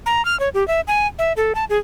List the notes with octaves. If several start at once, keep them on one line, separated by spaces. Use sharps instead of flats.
A#5
F6
C#5
G4
E5
G#5
E5
A4
A5
G#4